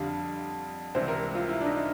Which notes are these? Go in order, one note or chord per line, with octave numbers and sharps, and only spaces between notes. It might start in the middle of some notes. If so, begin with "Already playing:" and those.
Already playing: F2 D3 G3 F5
C#2 C3 E3 G3 C5
A#4
F4
E4
D4
D#4